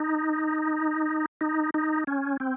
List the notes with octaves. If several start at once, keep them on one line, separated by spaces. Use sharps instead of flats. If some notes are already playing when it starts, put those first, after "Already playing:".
Already playing: D#4
D#4
D#4
C#4
C4